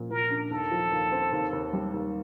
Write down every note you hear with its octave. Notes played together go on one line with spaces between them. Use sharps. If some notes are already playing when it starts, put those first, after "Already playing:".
Already playing: A#2 F3
A#2 A#4
D4
D#2 A4
F3
D#2
C4
D#2
D#2
G3
D#2